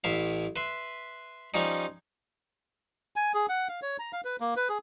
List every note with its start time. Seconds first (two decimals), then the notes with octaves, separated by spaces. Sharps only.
0.04 A1 A2 E5 F5
0.56 B4 E5 C6
1.54 F3 G3 C#4 D#4
3.16 G#5
3.34 G#4
3.49 F#5
3.68 F5
3.82 C#5
3.99 A#5
4.13 F5
4.25 B4
4.40 A#3
4.56 B4
4.69 G#4